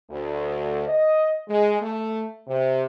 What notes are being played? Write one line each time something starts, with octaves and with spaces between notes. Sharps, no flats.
D2
D#5
G#3
A3
C3